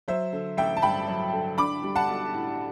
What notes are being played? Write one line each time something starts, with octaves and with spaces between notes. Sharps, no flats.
F#3 C5 E5
D3
A1 E5 G5
A5
G2 G5 B5
F#3
D3
D4 B5 D6
G3
F#5 A5
B1
A2